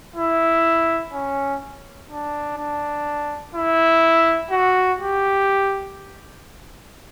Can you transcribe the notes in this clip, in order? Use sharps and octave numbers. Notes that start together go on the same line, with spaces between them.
E4
C#4
D4
D4
E4
F#4
G4